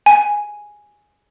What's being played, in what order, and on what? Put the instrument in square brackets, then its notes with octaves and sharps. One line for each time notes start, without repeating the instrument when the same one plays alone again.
[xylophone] G#5